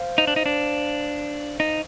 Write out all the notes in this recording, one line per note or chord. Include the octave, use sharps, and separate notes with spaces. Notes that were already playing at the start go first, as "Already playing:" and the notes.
Already playing: C5 F5
D#4
D4
D#4
D4
D#4